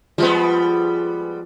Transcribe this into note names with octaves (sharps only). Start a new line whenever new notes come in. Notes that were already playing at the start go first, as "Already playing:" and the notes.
F3 G3 G#3 B3